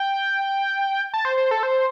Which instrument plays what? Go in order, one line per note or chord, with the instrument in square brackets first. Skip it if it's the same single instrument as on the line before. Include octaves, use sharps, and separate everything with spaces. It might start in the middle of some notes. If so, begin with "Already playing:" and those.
Already playing: [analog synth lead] G5
A5
C5
C5
A4
C5